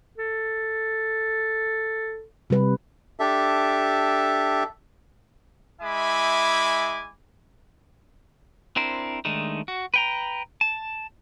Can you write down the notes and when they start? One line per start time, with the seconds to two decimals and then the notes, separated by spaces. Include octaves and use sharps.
0.18 A4
2.50 C3 G3 B4
3.20 D4 G4 A4 E5
5.82 G#3 E4 E5 G#5 B5 D6
8.76 C4 D4 E4 A#4 C5
9.25 D#3 G#3 A3 D4 D#4
9.68 F#4
9.94 B4 G5 A#5
10.61 A5